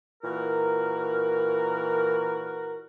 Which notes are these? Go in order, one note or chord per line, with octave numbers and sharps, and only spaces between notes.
A#2 E3 F#4 A#4